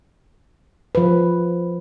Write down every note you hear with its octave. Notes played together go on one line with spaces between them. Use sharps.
F3 B4